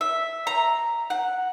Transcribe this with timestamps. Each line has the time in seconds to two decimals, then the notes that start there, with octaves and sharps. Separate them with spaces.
0.01 E5
0.47 A#5
1.10 F#5